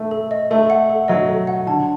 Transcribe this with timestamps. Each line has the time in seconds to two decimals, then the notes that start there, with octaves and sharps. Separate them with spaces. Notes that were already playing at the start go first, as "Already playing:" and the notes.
Already playing: A3
0.11 A4
0.31 D#5
0.51 A3 A4
0.70 F#5
0.90 A4
1.08 F#3 D#5
1.29 A4
1.47 F#5
1.67 D3 A5